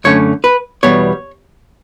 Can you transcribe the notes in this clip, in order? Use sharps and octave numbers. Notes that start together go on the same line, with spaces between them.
F#2 D3 A3 C#4 C#5
B4
E2 B2 G3 B3 C#5